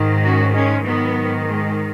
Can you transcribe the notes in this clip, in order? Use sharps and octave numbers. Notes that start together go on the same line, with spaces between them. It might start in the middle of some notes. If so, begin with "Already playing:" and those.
Already playing: G#2 D#3
C#4 F#4
G#3 C#4
G#2 D#3 F#3 B3
G#3